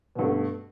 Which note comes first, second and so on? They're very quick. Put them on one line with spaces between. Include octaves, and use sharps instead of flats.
B2 G2 A3